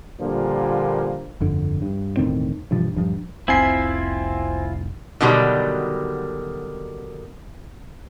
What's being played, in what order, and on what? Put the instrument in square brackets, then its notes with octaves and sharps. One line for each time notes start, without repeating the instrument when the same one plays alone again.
[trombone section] A#2 D3 F3 G3 A#3
[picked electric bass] G1 F2 D3
G2
E1 A2 D#3 C4
G2 B2 E3 F3
D#1 G2 F3
[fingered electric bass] F1 C2 [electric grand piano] C4 G#5 C7 [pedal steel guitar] E4 F4 E5
[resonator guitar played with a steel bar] B2 D3 D#3 F#3 G3